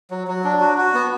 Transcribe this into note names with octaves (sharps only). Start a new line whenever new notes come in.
F#3
F#3
D4
F#4
F#4
B3